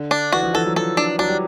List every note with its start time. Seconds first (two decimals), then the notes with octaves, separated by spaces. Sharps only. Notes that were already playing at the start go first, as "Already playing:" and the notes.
Already playing: D3
0.11 D4
0.32 E3 F#4
0.43 F3
0.54 E3 A4
0.66 F#3
0.76 F3 A4
0.97 D4
1.19 F#3 D4
1.28 G3